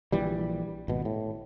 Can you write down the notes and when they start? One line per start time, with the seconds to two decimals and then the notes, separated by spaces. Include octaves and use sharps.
0.12 A#1 E3 G3
0.88 G#1 B2
1.05 A2